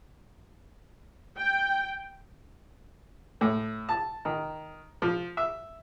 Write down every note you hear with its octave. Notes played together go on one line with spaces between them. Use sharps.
G5
A2
A5
D#3
F3
E5